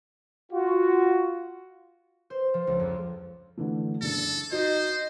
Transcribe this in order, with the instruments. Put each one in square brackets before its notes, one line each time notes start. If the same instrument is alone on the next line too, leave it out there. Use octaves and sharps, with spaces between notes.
[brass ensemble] F4 F#4
[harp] C5
F3
C#2
F2
[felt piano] D3 E3 A3
[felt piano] F#1 D4 [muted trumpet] A4
[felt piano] D#4 F#4 [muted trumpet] C5 [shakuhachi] D#5